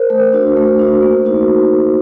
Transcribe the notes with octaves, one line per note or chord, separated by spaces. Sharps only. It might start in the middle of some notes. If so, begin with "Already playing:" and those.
Already playing: A#4 C5
A3
D4 F#4
A3
D4 F#4
A#3
D#4 F#4